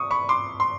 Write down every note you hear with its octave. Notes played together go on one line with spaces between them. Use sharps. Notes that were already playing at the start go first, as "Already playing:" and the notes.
Already playing: C#6 D#6
B5 C#6
C6 D6
C6